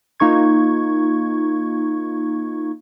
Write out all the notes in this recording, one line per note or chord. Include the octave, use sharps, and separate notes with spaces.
A#3 D#4 F4 C#6 G#6